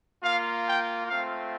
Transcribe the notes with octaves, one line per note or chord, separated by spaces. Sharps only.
A#3 F4 F5
G5
A3 C4 F4 F5